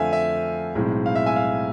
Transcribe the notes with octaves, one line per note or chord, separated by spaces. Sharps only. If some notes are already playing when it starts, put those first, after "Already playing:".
Already playing: F2 D3 A3 C4 E5 F5 G#5
E5
B1 A2 G#3 C4
F5
E5
E5 G#5
F5